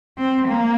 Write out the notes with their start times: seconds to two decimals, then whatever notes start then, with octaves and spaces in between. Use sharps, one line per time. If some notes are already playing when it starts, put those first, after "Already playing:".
0.18 C4
0.47 A#3